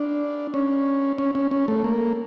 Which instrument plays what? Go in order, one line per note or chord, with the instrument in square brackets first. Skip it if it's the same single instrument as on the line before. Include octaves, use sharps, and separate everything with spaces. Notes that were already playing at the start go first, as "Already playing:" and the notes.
Already playing: [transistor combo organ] D4
C#4
C#4
C#4
C#4
A3
A#3